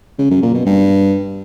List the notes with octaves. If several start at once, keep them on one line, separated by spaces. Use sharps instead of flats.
C#3
F#2
A#2
B2
G2